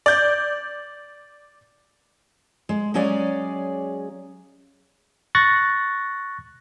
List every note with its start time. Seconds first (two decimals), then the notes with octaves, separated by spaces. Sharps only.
0.06 D5 G6
2.69 G#3
2.94 F#3 G#3 C#4 G#4 D5 F5
5.35 C#6 F#6 A6 A#6